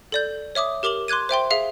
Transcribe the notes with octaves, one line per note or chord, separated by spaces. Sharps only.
A4 D5 G6
C#5 E5 D6 D#6
G4 A#4 D6 F7 F#7
C6 D6 F#6 G#6 D#7
C5 E5 G5 C6
G#4 E5 F5